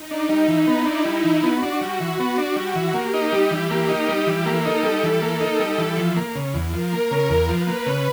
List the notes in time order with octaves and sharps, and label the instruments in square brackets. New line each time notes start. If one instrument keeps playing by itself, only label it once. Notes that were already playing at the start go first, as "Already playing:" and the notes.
Already playing: [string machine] D#4
[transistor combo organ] D4
G3
E3
[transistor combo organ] B3 [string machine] E4
[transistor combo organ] D4
G3
E3
[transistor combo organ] B3 [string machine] F#4
[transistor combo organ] D4
G3
E3
B3
D4
G3
E3
[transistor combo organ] A#3 [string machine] G4
[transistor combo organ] D#4
G3
E3
A#3
D#4
G3
E3
[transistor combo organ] A#3 [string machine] A4
[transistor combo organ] D#4
G3
E3
A#3
D#4
G3
E3
F3
A#3
C#3
E2
[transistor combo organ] F3 [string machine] A#4
[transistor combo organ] A#3
C#3
E2
[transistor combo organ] F3 [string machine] B4
[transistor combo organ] A#3
C#3